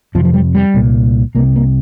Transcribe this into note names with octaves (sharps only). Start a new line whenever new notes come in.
F2 C3 F3
F3
G3
G3
C2 A#2
C2 C3 A#3
A#3